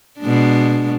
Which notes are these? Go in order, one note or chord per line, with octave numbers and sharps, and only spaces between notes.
B2 G#3 D4